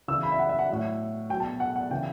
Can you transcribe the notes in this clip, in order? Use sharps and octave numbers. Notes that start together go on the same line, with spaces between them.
C#3 E3 E6
B5
E5
F#5
E5
F#5
A2 F#3
B2 F#3 G5
A5
F#5
F#5
C#3 E3 G5